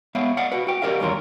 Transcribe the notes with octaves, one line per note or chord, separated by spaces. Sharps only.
G#3 B3 C#5 E5 F5
D5 D#5 F5 F#5
F#4 B4
F#4 G5
F#4 G4 A#4 D5 D#5 F5
E2 G2 D#3 A#4 C#5 C6